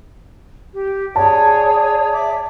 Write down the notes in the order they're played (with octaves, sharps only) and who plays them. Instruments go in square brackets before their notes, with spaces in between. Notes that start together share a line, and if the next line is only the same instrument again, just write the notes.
[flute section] G4
[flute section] G#4 C#5 D5 [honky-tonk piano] A5
[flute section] D5 E5 D6